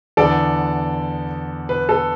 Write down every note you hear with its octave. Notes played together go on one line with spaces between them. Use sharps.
E2 D3 B3 A4 D5
B4
A4